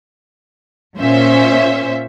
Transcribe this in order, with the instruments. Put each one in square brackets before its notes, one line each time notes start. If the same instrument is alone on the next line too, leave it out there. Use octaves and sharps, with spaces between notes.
[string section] A#2 C#4 C5 E5